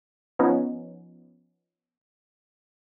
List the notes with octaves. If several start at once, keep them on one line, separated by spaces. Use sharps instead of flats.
F3 B3 C#4 D#4